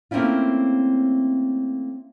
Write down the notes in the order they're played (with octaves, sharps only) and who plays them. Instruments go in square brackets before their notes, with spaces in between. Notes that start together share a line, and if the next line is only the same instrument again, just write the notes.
[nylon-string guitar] A3 A#3 C4 C#4 E4 F4